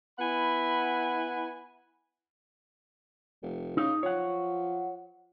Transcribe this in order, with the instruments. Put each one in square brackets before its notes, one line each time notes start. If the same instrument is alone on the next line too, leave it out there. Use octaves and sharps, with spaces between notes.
[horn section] B3 E4 F#5 G#5 B5
[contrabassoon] F1
[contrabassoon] C#3 [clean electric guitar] D#4
[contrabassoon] F3 [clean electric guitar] C#5 F#5